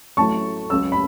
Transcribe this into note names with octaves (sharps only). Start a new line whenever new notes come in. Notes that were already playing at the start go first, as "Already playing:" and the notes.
A1 A2 F#3 A3 A5 C#6
C#2 C#3 F#3 C#4 E6
B5